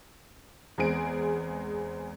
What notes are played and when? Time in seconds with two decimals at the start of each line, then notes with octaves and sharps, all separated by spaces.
0.78 E2 G#3 C4 G#4 D7